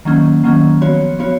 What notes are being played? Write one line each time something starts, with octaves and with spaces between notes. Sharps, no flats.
D#3 F#3 A#3 C#4
D#3 F#3 A#3 C#4
F3 B3 F#4 C#5
F3 B3 F#4 C#5